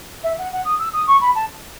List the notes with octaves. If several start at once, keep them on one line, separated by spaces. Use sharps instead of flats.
E5
F#5
F#5
D#6
E6
D#6
C#6
B5
A5